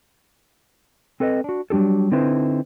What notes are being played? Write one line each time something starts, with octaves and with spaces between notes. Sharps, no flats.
C4 A4 B4 D5 D#5
D4 F#4
F#3 G3 D4 G4 A4
D3 C4 D#4 E4 B4 C5